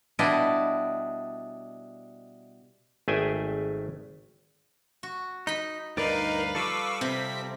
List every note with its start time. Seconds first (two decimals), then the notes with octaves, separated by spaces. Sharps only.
0.19 B2 G3 D4 E4 D5 D#5
3.08 G#1 A3 G#4 E5 G5 G#5
5.03 F#4
5.47 D#4 D#5 B5
5.97 D2 G2 D#4 A#4 B4 D5 F5
6.55 F3 G3 A4 C#6 D6 E6
7.01 C3 C4 B6